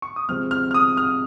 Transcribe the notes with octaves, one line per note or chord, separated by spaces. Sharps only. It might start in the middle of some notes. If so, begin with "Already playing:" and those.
C#6
D#6
C3 F3 G#3 C4 F6
F6
F6
D#6
F6